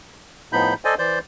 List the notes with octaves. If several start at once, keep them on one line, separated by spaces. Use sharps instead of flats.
A2 F3 B3 D#4 B5 G6
A4 C5 D5 D#5 G#5
E3 C5 D5 G6